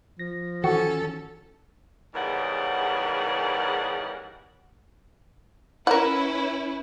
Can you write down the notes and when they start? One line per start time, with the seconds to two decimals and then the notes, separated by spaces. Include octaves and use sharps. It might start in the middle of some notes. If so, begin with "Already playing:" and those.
0.19 F3 A#6
0.64 D#3 E3 C#4 F#4 A4 C#7
2.14 E2 G#2 C#3 G3 A#4 F#5
5.87 C#4 E4 A#4 B4 F#5